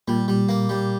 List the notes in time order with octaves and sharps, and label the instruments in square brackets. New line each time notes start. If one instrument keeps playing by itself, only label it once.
[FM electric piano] A#2 [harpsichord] G3
[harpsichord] G3
A#3
G3